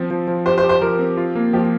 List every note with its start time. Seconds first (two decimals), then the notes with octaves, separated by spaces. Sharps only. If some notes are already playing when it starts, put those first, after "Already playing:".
Already playing: F3 C4
0.11 F3
0.28 F3
0.46 G4 C5
0.58 C5
0.64 G4
0.69 C5
0.81 F3 A#4
0.99 C4
1.17 F4
1.35 A#3
1.53 F3 G4